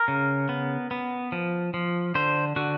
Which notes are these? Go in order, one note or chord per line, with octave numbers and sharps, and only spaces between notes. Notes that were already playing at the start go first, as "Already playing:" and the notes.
Already playing: A#4
C#3
B3
B3
F3
F3
D3 C5
D3 F#4